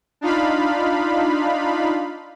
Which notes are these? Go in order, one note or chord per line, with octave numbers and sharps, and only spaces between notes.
D4 D#4 F4 F5 B5